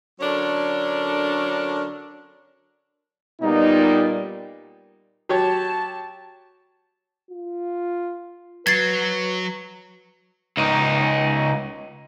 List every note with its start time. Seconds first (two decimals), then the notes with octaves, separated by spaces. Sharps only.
0.21 D3 F#3 C#4 D4 A4 A#4
3.42 A#2 G3 B3 D#4
5.29 F#3 G4 C#5 A5
7.31 F4
8.67 F#3 F#4 B4 G#6 A6 C7
10.57 C#2 D#4